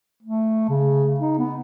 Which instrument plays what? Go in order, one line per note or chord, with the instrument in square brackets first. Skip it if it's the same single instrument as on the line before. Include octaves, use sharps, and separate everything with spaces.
[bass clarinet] A3
C#3
D#4
B3